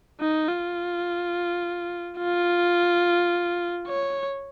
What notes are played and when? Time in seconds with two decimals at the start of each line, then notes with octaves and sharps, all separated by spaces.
0.20 D#4
0.48 F4
2.18 F4
3.88 C#5